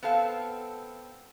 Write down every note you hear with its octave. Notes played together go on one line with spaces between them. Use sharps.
B3 C4 A4 F5